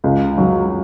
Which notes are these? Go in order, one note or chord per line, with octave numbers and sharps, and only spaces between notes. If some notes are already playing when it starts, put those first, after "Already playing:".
C#2
F#3